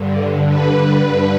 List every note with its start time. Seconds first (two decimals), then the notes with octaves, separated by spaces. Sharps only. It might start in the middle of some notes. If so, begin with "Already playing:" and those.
Already playing: G2 D3
0.47 B4
1.04 G2 D3